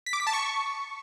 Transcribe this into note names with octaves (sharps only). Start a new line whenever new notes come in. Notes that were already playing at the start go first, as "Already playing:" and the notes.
B6
D6
B6
A5
C#6